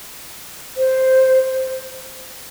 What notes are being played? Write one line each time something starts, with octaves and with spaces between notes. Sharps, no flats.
C5